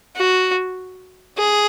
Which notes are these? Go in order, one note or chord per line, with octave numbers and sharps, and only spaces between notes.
F#4
G#4